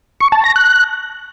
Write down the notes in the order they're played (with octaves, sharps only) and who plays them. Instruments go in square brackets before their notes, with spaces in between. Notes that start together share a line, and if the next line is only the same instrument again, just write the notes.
[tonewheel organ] C#6
A5
A#6
F#6